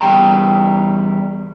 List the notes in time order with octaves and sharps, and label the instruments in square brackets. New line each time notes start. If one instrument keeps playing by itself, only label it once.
[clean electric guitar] E2 G2 G3 G5 A#5